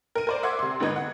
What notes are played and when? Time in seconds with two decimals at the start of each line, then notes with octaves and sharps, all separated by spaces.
0.15 A#4 D#7
0.27 A#4 C5 D5
0.43 E5 F#5 C6 D6 G#6
0.59 C3 C6
0.80 G#1 D3 B3 D#4 G#6
0.96 F#5